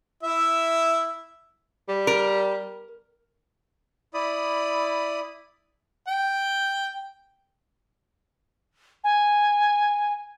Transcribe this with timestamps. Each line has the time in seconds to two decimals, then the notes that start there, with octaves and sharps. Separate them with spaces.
0.23 E4 E5
1.89 G3
2.07 A#4
4.14 E4 D5 B5 D#6
6.08 G5
9.04 G#5